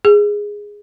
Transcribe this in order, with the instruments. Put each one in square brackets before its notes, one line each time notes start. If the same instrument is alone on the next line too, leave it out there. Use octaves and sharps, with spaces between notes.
[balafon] G#4